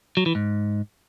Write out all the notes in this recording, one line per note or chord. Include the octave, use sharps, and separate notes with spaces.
F#3
E3
G#2